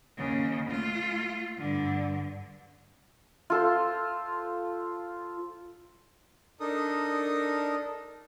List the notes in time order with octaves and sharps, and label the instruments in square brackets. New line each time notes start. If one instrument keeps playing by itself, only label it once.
[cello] D#2 C#3
A3 F4
G2 D3
[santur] F4 A4 C5
[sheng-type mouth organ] D4 D#4 A4 A#4 D#6